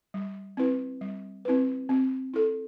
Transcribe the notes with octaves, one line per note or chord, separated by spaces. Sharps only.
G3
C4 E4 B4
G3
C4 E4 B4
C4
E4 A4